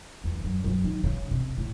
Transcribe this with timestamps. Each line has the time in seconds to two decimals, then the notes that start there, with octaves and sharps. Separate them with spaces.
0.24 E2
0.36 E2
0.44 F#2
0.64 F#2
0.84 D#3
1.04 C#3
1.31 C3
1.57 A2